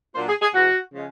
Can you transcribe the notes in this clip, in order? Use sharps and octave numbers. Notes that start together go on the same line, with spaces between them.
A#2 F#3 A#3 D4 F4 C5
G#4
G#4
E2 B2 G#3 F#4
C#3 F3 G#3